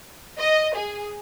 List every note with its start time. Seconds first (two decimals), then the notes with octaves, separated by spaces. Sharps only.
0.38 D#5
0.75 G#4